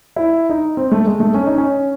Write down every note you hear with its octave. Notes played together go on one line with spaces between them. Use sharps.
E4
D#4
C4
A3
G#3
A3
C#4
D#4
C#4